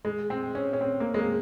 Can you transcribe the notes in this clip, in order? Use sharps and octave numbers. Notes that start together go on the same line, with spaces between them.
G#3
C4
C#4
C#4
C4
A#3
G#3
A#3